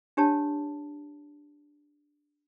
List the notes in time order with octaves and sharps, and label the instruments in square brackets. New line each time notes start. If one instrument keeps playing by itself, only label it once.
[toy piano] D4 G4 C#5 A5